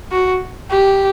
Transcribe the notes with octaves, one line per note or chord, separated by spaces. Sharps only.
F#4
G4